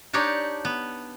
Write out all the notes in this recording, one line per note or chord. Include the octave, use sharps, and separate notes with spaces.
D4 D#4 G4 C#5 D5
B3